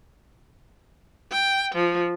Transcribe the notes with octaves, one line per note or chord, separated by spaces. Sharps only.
G5
F3